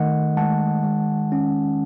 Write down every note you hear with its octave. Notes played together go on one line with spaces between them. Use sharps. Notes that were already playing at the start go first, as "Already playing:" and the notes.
Already playing: D#3 A3 D#5 F#5
G#3 F#5 A5
G#3
C#4